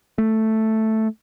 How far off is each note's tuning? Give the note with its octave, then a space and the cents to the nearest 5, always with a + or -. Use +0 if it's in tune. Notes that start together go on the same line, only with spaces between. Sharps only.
A3 +0